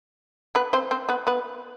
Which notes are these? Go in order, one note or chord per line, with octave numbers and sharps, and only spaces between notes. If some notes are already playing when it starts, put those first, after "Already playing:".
B3 B4
C4 C5
C4 C5
B3 B4
B3 B4